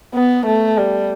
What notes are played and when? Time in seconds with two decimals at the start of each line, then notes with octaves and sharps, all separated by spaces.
0.14 B3
0.46 A3
0.77 G3